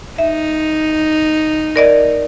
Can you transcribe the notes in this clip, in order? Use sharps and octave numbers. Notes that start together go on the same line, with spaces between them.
D#4 E5
A#4 D5 D#5